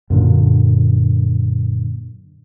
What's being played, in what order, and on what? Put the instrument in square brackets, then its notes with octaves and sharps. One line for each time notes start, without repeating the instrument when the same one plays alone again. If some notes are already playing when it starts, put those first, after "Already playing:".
[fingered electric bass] F#2 A#2 D3